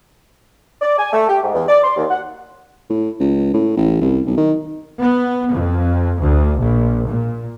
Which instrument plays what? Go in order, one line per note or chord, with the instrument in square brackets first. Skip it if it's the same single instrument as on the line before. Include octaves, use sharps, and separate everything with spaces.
[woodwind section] D5
G#5
A3
G4
G#2
E2
D5
C6
D#2
F#5
[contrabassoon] A2
C#2
A2
A1
C2
B1
D#3
[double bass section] B3
F2
D2
A#1
A#2